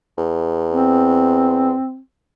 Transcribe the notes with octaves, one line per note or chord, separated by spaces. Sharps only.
E2
C4